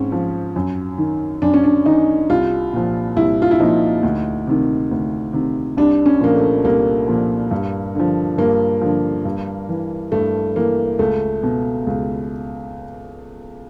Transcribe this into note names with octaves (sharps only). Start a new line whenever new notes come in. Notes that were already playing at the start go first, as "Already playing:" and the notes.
Already playing: G#2 C4 C#4
F3
F#2
D#3
F#2 D4
C#4
D4
D#3 D#4
C2 F4
A#2 F3
C2 E4
F4
E4
A#2 F3 D#4
D2
C3 D#3
D2
C3 D#3
C2 D4
C#4
A#2 F3 A#3
A3
C2 A#3
A#2 F3
G2
D3 F3
G2 A#3
D3 F3
G2
E3
G2 A3
E3 A#3
C#2 A3
B2
C#2